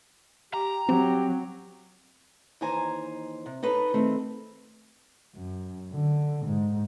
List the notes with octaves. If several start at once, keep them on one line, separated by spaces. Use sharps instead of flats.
G4 A#5
F#3 C4 G4
D#2 E3 D#4 C5 G#5 A#5
C3
D#4 A4 B4 C#5
D#3 A3 C4
F#2
D3
G#2